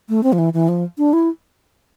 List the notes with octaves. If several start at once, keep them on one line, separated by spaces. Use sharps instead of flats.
A3
C4
F3
E3
E3
F3
D4
E4